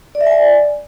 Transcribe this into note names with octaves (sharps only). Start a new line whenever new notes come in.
D5
E5
G#5
D5